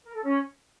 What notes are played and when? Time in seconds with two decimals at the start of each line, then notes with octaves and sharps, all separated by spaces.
0.04 A#4
0.14 A4
0.23 C#4